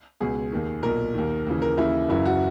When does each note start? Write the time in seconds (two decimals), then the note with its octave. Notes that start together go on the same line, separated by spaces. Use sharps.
0.21 C#2 B2 G#4
0.52 D#2 D#3
0.83 B1 A#2 A#4
1.14 D#2 D#3
1.47 D#2 C#3 E3
1.62 A#4
1.77 D#2 C#3 E3 E4
2.09 F#1 F#2 C#3 E3 E4
2.25 F#4